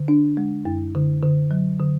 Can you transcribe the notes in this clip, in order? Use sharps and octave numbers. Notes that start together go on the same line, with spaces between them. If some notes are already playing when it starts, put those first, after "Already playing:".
Already playing: D3
D4
G#3
F#2
D3
D3
F#3
D3